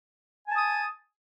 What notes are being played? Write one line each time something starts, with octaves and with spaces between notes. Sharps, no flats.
G#5 A5 D#6